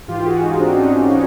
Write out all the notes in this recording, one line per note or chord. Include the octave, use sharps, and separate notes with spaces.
G#2 E3 F4 G4
G4
F#4 G#4
D#4 F4
C4 D4
C#4 D#4
C#4 D#4